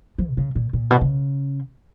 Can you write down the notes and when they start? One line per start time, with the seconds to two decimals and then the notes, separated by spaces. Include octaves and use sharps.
0.18 F3
0.30 B2
0.37 C#3
0.55 A#2
0.73 A#2
0.91 B2
1.01 C#3